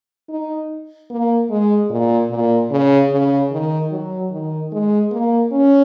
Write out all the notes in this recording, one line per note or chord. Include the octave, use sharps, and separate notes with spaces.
D#4
A#3
G#3
A#2
A#2
C#3
C#3
D#3
F#3
D#3
G#3
A#3
C#4